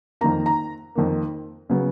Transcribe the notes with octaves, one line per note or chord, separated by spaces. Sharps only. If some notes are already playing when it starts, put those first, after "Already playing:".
F2 D#3 A#3 A#5
A#5
F2 D#3 A#3
C#3 F#3 B3